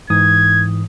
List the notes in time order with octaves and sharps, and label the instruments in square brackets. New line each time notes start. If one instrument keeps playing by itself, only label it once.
[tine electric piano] G#2 E3 D#6 [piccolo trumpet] G#6